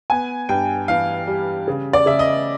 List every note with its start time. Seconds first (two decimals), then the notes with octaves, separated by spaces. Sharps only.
0.10 B3 G#5
0.49 G2 G5
0.88 E3 F5
1.27 G3
1.67 C#3
1.93 D5
2.06 C#3 E5
2.19 D#5